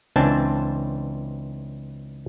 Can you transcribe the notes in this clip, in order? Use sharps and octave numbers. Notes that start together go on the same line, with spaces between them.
C#2 E3 C4 D4 G#5 A5